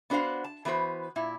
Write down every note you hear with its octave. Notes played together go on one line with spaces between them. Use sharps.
B3 D4 F#4 C5 F5 F#5
A5
E3 B3 F#4 B4 C5
A#2 E4